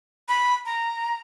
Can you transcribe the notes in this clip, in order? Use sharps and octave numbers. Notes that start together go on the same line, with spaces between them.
B5
A#5